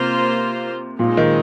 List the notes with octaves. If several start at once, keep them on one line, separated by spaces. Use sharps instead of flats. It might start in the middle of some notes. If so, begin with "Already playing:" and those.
Already playing: C3 A#3 F4 C5
A#2 G#3 C4 D#4
D#3